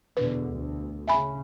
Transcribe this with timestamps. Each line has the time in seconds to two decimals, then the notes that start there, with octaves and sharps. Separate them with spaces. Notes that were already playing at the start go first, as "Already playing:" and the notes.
0.17 E2 B2 D3 B4
0.50 D2
1.08 C#3 E5 G#5 B5